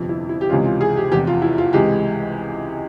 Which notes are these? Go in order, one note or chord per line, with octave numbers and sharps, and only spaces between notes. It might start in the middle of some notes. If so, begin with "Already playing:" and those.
Already playing: G1 F2 C3 F3
E4
E4
G4
C#2 C3 E3 G#3 C#4 F4
F4
G#4
G4
F1 E2 C3 G4
F4
E4
F4
C#2 C3 E3 G#3 G4